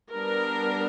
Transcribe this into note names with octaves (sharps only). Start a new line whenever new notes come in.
G3 B3 D4 A#4